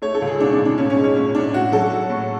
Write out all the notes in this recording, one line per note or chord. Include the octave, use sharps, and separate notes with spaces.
A3 C#5
A4
C#2
G#4
B2 D4
D4
C#2
D4
A2 C#4
C#4
G#3
C#4
A2 C#4
A2 D4
A2 F#4
F#3 A4
F#3
A2